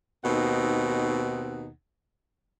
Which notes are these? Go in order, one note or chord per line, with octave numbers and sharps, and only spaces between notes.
D#2 B2 C4 D#4 F#5